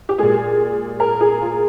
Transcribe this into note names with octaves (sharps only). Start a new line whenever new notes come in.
G4
A#2 G#3 G#4
A#4
G#4
F4